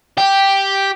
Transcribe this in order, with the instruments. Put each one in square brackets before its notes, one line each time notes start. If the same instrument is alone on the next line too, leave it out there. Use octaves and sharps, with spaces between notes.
[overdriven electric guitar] G4